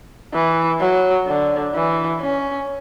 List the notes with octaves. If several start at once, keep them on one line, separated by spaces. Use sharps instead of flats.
E3
F#3
D3
E3
C#4